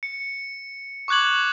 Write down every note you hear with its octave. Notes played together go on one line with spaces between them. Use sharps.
C#7
C#6 D6 F#6 G#6 F#7